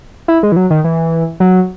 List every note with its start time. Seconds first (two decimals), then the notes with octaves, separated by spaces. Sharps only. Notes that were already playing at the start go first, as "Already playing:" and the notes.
0.28 E4
0.43 G#3
0.52 E3
0.56 F#3
0.70 D#3
0.84 E3
1.40 F#3